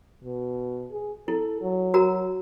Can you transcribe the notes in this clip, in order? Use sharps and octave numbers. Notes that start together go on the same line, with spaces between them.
B2
G#4
E4 A4
F#3
F#4 A#4 A#5